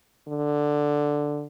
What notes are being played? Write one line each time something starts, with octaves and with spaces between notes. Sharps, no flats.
D3